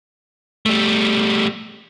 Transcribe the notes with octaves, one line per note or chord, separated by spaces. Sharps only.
G3 A3